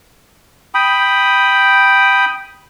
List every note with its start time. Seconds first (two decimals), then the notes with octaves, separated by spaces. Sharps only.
0.74 G5 B5 D#6